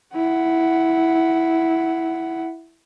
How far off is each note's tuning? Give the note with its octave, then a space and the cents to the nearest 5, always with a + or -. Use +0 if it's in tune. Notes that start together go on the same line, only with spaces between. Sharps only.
E4 +0 F#5 +5